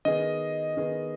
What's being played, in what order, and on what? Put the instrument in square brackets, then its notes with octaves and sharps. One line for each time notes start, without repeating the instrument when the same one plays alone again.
[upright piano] D#3 B3 G#4 [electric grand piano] D#5
[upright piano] D#3 B3 G#4